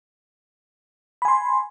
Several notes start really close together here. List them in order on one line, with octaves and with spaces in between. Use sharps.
B5 G#5 C6